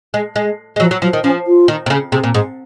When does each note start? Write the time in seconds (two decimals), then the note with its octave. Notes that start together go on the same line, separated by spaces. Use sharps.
0.14 G#3
0.36 G#3
0.76 G#3
0.80 F3 F#3
0.91 F#3
1.02 F3 F#3
1.13 D#3
1.23 F3 C#4
1.47 F4
1.68 D#3
1.86 C3
1.90 C#3
2.12 C3 G#4
2.24 A#2
2.34 G#2 G#4